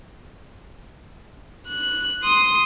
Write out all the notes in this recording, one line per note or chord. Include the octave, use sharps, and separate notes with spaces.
F#6
C6 D#6